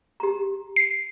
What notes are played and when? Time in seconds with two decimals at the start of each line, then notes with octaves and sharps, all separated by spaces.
0.20 G4 A#5
0.76 C7